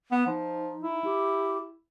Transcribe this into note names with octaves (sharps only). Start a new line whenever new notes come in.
B3
F3 D#4
E4
G4